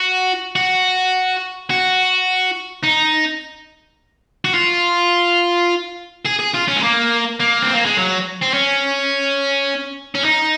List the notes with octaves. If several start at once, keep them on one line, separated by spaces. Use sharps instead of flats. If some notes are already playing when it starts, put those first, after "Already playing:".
Already playing: F#4
F#4
F#4
D#4
F#4
F4
G#4
G#4
F4
C#4
G#3
A#3
A#3
C4
A#3
G#3
F#3
C4
C#4
C#4
D#4